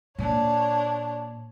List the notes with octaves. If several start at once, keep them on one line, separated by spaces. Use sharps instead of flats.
A#2 D4 C#5